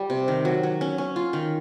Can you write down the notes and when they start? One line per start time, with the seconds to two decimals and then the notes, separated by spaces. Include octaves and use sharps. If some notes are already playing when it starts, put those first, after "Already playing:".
Already playing: G3
0.10 C3
0.28 D#3
0.45 F#3
0.63 F#3
0.81 C#4
0.98 C#4
1.16 F4
1.33 D#3